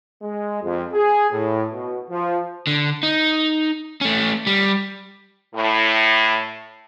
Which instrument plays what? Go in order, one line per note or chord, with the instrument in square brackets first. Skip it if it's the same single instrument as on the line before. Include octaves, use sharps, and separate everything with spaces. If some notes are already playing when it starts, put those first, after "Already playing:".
[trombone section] G#3
F2
G#4
A2
B2
F3
[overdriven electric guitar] D3
D#4
A3 C#4
G3
[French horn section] A2